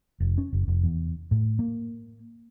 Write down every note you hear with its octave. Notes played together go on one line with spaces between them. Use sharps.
F1
C#4
F#1
F1
E2
A2
A#3